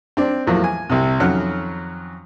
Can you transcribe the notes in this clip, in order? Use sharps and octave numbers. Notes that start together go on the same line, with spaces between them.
C4 D4
E2 A2 F3 F#3 A#3
G#5
C2 C3
F2 D#3 F#3 C#4 F#5 F6